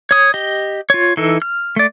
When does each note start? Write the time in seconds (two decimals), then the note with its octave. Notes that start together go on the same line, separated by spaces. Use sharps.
0.11 C#5 D#6
0.34 G4 D#5
0.90 F4 C#5
1.17 E3 D#4 A4
1.42 F6
1.76 A3 D5